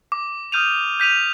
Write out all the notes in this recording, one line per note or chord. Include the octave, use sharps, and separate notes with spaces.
D6
D#6 F6 G6 D#7 F7
G6 B6 D#7 F7